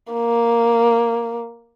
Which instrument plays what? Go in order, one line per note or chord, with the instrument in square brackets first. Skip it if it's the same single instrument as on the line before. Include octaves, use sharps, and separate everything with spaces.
[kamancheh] A#3